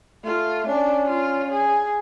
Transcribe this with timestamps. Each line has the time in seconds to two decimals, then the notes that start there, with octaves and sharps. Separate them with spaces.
0.24 A3 F4
0.67 C#4 D4
1.09 F4
1.51 G#4